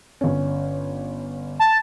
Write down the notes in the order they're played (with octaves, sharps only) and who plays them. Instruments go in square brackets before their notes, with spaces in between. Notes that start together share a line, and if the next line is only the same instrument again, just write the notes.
[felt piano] G1 C#4
[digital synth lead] A5